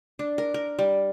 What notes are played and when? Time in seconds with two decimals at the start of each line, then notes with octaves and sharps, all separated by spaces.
0.19 D4
0.38 A#4
0.54 A#4
0.79 G3